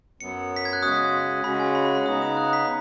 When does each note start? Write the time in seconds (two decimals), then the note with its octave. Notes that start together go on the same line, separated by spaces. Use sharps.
0.20 F#2 F#3 B3 C#7
0.56 B6
0.65 G#6
0.73 F#6
0.82 C#3 G#3 C#4 F#4 D#6
1.44 C#3 G#3 C#4 F#4 B5
1.60 G#5
1.75 B5
1.85 B5
1.95 B5
2.06 C#3 B3 D#4 D#6
2.22 D#6
2.37 F#6
2.53 B6